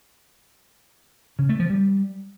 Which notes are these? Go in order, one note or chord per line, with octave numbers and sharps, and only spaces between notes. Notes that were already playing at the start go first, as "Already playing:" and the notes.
C#3
A3
F3
G3